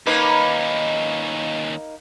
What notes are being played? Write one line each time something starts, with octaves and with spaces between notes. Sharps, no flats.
D#2 A#3 C#4 D#4 B4